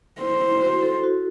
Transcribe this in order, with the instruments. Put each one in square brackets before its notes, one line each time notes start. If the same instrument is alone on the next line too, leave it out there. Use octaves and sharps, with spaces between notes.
[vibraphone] E4 [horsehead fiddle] C5
[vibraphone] E4
F#4
A4
F#4